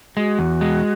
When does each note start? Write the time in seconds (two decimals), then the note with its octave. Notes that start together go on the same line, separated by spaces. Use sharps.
0.16 G#3 F#4
0.39 E2
0.61 G#3